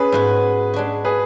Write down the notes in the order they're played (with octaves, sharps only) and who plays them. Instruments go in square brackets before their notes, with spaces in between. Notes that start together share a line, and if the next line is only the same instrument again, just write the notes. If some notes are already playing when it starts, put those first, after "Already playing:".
Already playing: [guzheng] C#4 C#5 [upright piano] G#4 B4
[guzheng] G#2 G#3 B3 F#4
G#3 D4 F#4
[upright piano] G#4 B4